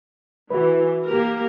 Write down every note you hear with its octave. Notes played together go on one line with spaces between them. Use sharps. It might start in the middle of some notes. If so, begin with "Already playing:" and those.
E3 F#4 B4
A#3 G4 A#4